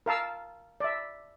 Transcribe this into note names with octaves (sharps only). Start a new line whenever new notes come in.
A#4 F5 A5 E6
D5 E5